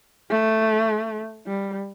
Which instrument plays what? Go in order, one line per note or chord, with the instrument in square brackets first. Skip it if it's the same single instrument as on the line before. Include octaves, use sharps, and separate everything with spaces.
[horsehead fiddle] A3
G3